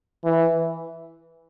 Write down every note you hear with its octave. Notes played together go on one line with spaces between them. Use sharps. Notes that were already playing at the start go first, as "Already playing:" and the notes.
E3